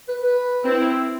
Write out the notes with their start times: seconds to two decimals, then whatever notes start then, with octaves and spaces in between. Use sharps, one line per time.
0.09 B4
0.22 B4
0.65 C4 E4